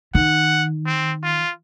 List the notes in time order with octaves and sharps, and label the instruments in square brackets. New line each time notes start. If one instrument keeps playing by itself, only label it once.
[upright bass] D#3 [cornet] F#5
[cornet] C4
F4